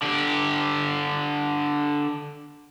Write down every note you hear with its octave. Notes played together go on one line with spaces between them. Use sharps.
D3 G4